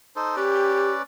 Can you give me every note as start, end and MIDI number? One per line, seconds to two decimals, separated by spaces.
0.16 0.36 63
0.16 0.36 69
0.16 0.36 72
0.36 1.02 61
0.36 0.89 67
0.36 1.02 71
0.36 1.02 74